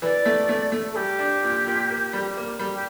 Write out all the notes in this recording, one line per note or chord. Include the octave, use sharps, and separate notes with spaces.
E3 D5
A3
A3
A3
A4
G3 G4
D4
A#2
A#2
A#3
G3
A#3
G3
G4